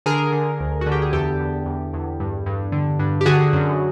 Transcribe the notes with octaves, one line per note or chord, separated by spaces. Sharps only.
D3 G#4 A#4
D3
D2
F#4
D3
G4
G#4
E2 G4 A4
E2
E2
E2
G2
G2
D3
G2
G4
D3 F#4 G#4
F#2